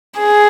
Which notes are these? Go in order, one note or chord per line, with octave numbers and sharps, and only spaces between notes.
G#4